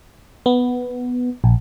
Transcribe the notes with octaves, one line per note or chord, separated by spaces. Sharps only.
B3
A#1